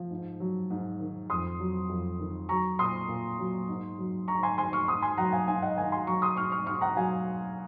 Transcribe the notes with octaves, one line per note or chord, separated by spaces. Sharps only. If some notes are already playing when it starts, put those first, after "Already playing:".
Already playing: F3
G#2
F#3
G#2
D#3
F2 C6 D#6
F#3
F2
D#3
F#3 A#5 C#6
A#2 C6 D#6
A#2
F#3
G#2
F#3
G#2 A#5 C#6
G#5 C6
D#3 G#5 C6
C#6 F6
G#2 C6 D#6
G#5 C6
F#3 F#5 A#5
F5 G#5
G#2 F5 G#5
D#5 F#5
D#3 F5 G#5
G#5 C6
F#3 A#5 C#6
C6 D#6
G#2 C#6 F6
C#6 F6
G#2 C#6 F6
F#5 A#5
F#3 F5 G#5